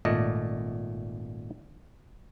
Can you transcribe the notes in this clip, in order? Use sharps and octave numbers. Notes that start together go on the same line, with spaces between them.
G#1 A#2 A3 D5 D#5